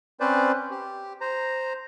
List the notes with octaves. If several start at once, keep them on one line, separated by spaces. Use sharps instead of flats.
C4 C#4 B4 C5 D5
G4
C5 A#5